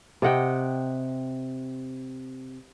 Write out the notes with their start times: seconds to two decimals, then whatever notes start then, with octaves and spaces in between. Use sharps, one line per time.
0.22 C3 D#5 F#5 G5